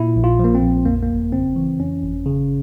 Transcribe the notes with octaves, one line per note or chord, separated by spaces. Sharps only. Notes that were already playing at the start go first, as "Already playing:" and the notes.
Already playing: A#2 E4
A#1
F4
F3 A#3
C4
A#1
F2 A#3
A#3
G1
C#3 C4
E3
F2 C#4
G1
C#3